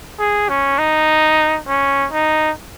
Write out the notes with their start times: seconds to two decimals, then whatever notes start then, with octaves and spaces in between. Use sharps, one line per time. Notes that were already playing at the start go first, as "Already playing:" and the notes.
0.19 G#4
0.49 C#4
0.79 D#4
1.67 C#4
2.12 D#4